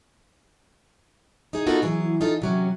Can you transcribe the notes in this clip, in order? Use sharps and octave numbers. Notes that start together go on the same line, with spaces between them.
D#4 G#4
B3 D#4 F4 F#4 A4 A#4
E3 F#3 G#4
D#4 F4 A4
C3 F#3 C#4